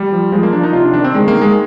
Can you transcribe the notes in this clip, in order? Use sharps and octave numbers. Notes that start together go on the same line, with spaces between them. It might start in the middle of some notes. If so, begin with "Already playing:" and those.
Already playing: G3
F3
F3 G#3
A#3
F3 D4
D#4
C3 F4
D4
D#3 D4
C4
D#3 G#3
A#3
D#3
G#3